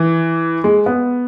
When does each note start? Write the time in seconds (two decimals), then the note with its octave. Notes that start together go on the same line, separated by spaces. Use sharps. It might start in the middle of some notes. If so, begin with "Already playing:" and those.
Already playing: E3
0.64 G#3
0.86 B3